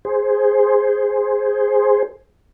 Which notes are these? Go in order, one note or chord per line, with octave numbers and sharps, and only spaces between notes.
G#4 C5